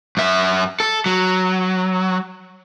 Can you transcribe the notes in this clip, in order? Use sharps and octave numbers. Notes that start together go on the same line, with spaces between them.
F#2 E5
A4
F#3